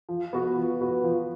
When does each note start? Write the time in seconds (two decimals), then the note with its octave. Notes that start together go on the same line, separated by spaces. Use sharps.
0.09 F3
0.33 B3 F#4 B4
0.57 F3
0.81 B3 F#4 B4
1.04 F3